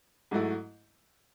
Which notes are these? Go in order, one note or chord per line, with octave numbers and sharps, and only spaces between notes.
G#2 F#3 A3 E4